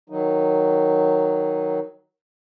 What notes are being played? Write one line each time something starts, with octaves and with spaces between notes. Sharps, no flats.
D#3 F#3 D#4